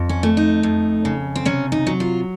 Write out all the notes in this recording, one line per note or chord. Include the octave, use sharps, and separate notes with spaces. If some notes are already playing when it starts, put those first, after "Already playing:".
Already playing: F2
C#4
A3
D#4
F2
C#3
C4
C3 C#4
D#4
F#3
F4